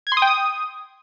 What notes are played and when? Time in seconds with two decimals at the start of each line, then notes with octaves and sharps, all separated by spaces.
0.07 G#6
0.12 C6
0.17 D#6
0.22 G5
0.27 D#6